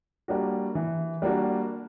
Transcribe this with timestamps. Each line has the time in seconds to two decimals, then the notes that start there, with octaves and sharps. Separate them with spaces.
0.28 G3 A#3 D4 F#4
0.75 E3
1.22 G3 A#3 D4 F#4